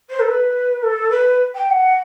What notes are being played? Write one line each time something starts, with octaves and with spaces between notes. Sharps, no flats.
C5
A4
B4
A4
B4
G5
G5
F#5